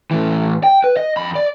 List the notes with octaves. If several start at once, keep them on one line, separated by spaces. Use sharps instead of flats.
A2 E3
G5
B4
D#5
F2 B5
D5